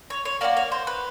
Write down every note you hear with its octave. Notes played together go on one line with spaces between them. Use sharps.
C#5
C#5
A#3 D4 F#4 D5
C#5
C5
B4